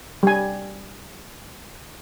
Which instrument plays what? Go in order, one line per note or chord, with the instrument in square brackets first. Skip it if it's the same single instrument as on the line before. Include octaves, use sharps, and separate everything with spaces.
[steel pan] G3 G#5